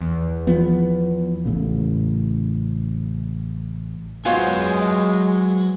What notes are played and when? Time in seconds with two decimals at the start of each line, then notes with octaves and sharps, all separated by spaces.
0.01 E2
0.47 E3 F3 B3
1.45 A1 A2 C#3
4.25 F#3 G#3 B3 F4 F#4 C5 C#5 G#5